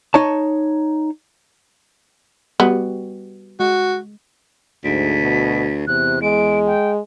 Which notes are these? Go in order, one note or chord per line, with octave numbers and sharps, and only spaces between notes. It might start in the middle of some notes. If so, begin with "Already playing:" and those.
D#4 C#5 A5
G3 B3 F#4
G#3 F#4
D2 G#2 B6
B2
E2 C3 F#6
G#3 D7
G5